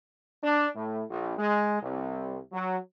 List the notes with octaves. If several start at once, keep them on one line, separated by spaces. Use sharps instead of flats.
D4
A2
A#1
G#3
C2
F#3